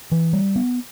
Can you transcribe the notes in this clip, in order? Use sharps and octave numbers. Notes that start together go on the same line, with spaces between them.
E3
G3
B3